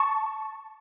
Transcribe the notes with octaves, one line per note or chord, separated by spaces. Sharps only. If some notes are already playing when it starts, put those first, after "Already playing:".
Already playing: A5 C#6